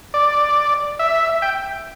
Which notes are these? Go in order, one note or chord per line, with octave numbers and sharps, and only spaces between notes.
D5
E5
G5